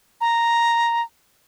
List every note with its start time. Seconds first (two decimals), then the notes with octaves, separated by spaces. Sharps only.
0.21 A#5